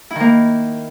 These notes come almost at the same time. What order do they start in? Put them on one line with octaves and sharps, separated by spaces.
E4 D#3 A#3